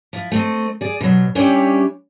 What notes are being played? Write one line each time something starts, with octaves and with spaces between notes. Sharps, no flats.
F3 E4
A3 C4 D#5
G#4 D5
B2 F#3
G3 C#4 D4 E4 G4